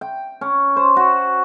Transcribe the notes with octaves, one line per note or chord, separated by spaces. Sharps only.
G5
C#4
C5
F#4